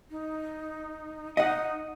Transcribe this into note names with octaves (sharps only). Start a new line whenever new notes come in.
D#4
D#4 D#5 F#5